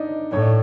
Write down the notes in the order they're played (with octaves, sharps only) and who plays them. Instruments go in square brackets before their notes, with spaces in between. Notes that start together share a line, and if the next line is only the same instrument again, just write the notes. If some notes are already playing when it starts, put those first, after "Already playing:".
Already playing: [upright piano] D4 D#4 D5
[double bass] A2 [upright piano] C#5
[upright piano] D5